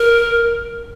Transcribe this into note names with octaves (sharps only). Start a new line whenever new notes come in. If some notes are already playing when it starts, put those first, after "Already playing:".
Already playing: A#4